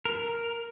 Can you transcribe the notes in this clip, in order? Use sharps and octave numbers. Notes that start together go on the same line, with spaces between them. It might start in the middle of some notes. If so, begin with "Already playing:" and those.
A#4